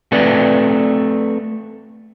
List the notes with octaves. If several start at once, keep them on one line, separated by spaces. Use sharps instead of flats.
A3 C4 B4 D5